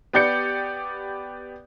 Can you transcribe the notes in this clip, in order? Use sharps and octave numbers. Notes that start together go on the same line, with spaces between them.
B3 G4 D5 G6 C#7